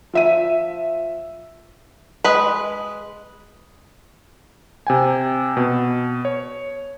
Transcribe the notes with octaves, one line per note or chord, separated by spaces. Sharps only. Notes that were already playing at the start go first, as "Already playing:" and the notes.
F3 E5 D#7
G#3 B4
C3 G5 G#5
B2
C#5